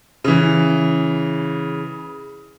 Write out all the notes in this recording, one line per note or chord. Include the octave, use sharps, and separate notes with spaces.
C#3 E3